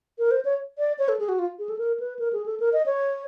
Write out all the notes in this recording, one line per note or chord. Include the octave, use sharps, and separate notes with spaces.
A#4
C5
C#5
D5
C#5
A4
G#4
F#4
F4
G#4
A4
A#4
B4
A#4
G#4
A4
A#4
D#5
C#5